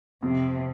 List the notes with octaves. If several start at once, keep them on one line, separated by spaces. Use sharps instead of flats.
F2 C3